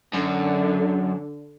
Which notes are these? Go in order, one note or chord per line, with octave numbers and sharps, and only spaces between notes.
F#2 D3